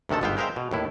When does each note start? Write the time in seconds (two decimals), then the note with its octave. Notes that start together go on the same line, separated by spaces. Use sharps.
0.09 D2 C3 D#3 A4 A5
0.21 G1 G#2 B3 E5 F5 G5
0.37 G#3 A#4 C5 E5 F5 G5
0.56 B2
0.71 D#2 A2 E4